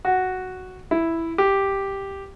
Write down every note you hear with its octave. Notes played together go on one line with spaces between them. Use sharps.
F#4
E4
G4